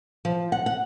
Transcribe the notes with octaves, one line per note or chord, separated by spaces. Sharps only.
F3
F#5
F#5